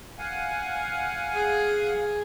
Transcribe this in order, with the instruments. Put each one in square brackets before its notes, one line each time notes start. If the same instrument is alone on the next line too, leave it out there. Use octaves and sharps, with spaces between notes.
[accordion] F5 F#5 G#5
[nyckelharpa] G#4